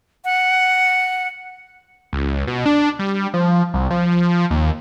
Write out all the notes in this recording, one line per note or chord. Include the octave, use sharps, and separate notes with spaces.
F#5
C#2
B2
D4
G3
F3
C2
F3
D#2